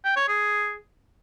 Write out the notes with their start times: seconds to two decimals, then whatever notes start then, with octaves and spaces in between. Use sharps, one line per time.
0.05 G5
0.17 C#5
0.28 G#4